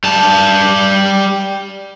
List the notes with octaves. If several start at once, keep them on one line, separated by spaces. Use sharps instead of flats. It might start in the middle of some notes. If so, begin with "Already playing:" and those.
G3 A5